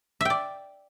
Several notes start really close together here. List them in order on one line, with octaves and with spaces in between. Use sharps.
E5 G5 D5